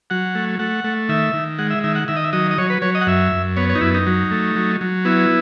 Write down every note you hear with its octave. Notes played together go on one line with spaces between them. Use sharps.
F#3 F#5
A3
A3 F#5
A3
D#3 E5
D#3
G#3 F#5
E5
D#3 E5
F#5
D#3 E5
D#5
E5
F#3 D#5
D#5
F#3 C#5
B4
F#3 C#5
D#5
F#5
F#2 E5
F#2
B3 C#5
C#5
D#4
F#2 E4
D#4
F#3
A3
F#3
F#3
B3 E4